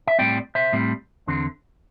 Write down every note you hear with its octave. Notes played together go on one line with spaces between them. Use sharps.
E5
A2 G3 C4 D5 G5
C5 E5
A2 G3 C4
E2 D3 C4